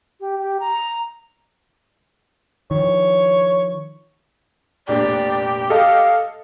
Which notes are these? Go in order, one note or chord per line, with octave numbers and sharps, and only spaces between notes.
G4
G4
A#5
D#3 F3 C#5
F1 A#2 D4 G4 D5
A4 D#5 F5 F6